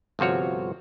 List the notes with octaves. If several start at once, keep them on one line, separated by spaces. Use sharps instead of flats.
G1 C3 F3 F#4 C#5